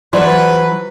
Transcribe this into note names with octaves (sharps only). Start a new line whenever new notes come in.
E3 F#3 F4 A4 B4 C5 D5